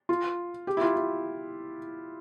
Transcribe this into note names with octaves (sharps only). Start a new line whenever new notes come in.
F4
G4
E4
F4
E4